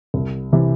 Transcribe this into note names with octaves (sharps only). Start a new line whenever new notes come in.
C2
C3 E3